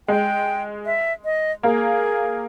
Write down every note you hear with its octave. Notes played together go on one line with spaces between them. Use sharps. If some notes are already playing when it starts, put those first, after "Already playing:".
G#3 G5
E5
D#5
A#3 G#4